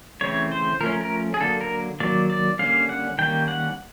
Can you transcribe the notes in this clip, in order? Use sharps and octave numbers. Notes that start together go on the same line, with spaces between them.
C#3 E3 A3 C4 C#5
C5
F3 A3 C#4 A#4
A#4
G#4
D3 F#3 A#3 A4
A#4
D#3 F#3 A#3 D5
D5
D3 G3 A#3 C#4 F5
F#5
D#3 G3 A#3 C#4 G5
F#5